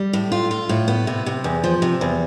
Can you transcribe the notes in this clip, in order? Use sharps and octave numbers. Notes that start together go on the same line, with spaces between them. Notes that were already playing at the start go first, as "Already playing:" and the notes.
Already playing: G3
A2
F4
F4
A2
B3
C3
C3
E2
F3
C3
E2